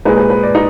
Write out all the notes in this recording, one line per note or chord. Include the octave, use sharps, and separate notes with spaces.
A#2 G#3 D#4 B4
B4
B4
D5
D#4